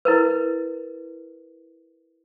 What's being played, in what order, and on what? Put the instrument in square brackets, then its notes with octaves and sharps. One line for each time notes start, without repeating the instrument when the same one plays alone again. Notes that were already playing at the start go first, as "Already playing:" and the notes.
[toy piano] E4 A#4 B4